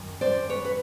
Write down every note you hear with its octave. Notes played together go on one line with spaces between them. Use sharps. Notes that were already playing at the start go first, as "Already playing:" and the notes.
Already playing: F#2 D#3
C5 D5
B4 C#5
B4